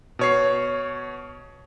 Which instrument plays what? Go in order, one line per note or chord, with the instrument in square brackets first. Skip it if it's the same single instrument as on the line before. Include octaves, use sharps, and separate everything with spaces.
[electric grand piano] B2 C#5 C7